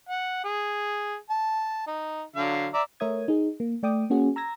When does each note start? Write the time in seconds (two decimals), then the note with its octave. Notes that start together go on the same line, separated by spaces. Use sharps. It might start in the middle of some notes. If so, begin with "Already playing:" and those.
0.09 F#5
0.44 G#4
1.30 A5
1.87 D#4
2.36 D3 F#3 F5
2.73 D5 E5 A#5
3.00 A3 A#4 C#5 E5 D#6 G#6
3.28 D#4 G#4
3.60 A#3
3.83 A3 D5 G5 D6 D#6
4.10 A#3 C#4 F#4 G#4
4.36 A#5 E6 G#6 A#6